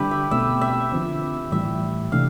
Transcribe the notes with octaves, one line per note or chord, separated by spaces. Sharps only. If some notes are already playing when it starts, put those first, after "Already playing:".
Already playing: D3 G3 D4 E4 G4 B4
E5
B2 A3 C4 E5
E5
D3 F3 C4
A2 E3 G3 E5
C3 E3 A3 D4 F5